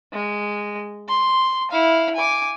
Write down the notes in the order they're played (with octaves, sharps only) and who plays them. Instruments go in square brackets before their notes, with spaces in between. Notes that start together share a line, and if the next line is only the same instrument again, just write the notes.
[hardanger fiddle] G#3
C6
E4 F5
G#5 D6